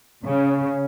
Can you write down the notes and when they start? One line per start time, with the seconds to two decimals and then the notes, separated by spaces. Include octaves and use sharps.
0.25 C#3 C#4
0.51 C#4